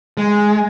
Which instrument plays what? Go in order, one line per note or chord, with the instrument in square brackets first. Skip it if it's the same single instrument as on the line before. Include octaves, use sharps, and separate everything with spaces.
[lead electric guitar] G#3